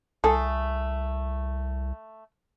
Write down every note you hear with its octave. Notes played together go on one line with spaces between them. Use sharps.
C2 A3 G#4 A4